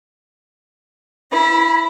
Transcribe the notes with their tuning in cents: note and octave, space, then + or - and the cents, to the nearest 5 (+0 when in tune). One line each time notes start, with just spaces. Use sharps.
E4 +10 B5 -30